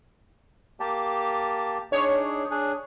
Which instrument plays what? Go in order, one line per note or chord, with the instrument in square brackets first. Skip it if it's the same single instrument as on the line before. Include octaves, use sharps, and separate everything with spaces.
[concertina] A#3 G4 A5
[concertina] D4 D#4 G#4 [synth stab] C#5
[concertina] D4 G#4